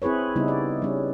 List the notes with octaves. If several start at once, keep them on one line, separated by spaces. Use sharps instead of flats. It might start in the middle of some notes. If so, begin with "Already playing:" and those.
C4 E4 G#4 B4 C#5
C#3 G3 B3 D#4 E4
D5
G3 C#4